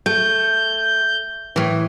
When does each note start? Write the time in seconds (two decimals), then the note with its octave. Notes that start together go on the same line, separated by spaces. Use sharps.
0.06 A3 G6
1.56 A2 E3